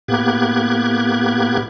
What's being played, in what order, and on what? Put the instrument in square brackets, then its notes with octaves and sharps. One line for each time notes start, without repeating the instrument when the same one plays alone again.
[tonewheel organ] A2 A#3 B3 G4 F#6 G#6